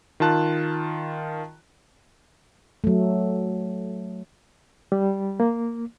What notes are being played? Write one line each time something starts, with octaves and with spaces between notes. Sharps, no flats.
D#3 F4 A5 F#6
F#3 A3
G3
A#3